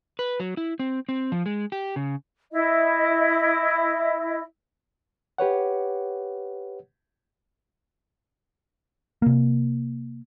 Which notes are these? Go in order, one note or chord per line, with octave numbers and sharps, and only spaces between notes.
B4
F#3
E4
C4
C4
F3
G#3
G4
C#3
E4 D#5
G4 B4 C#5 F#5
C3 A#3